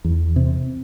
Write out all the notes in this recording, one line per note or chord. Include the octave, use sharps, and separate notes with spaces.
E2
C3